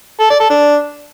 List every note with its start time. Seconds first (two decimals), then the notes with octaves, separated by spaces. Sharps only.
0.20 A4
0.30 D5
0.40 A4
0.50 D4